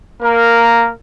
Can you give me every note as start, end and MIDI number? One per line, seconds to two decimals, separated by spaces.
0.22 0.92 58
0.22 0.92 70